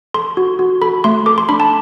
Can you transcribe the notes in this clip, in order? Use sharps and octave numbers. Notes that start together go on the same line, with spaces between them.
A4 C6
F#4
F#4
A4 B5
A3 C6
A4 D6
C6
D4 B5
A5